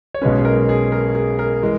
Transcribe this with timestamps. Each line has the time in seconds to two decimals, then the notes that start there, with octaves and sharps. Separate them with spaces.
0.14 C#5
0.22 B1 B2 G#3 C#4 B4
0.39 G#4
0.45 A#4
0.69 G#4
0.92 A#4
1.15 G#4
1.39 A#4
1.63 E3 G#3